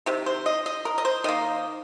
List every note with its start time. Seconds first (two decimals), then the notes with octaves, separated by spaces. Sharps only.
0.06 C3 D#3
0.26 C5
0.46 D#5
0.66 D#5
0.85 A#4
0.98 D#5
1.05 C5
1.24 D#3 A#3 D#5